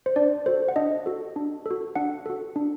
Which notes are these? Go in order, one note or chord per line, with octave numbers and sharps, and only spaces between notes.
C5
D4 D5
F#4 A4 C5
F#5
D4 D#5
F#4 A4
D4
F#4 A4
D4 F#5
F#4 A4
D4